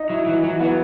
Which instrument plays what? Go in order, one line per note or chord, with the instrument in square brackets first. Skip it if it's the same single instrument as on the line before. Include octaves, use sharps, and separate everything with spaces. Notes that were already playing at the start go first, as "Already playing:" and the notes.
Already playing: [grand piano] D#4
[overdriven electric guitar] F#3 [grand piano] E4
[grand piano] E3 [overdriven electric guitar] F#3
[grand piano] E3 [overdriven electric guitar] F#3
[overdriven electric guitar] F#3 [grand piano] B3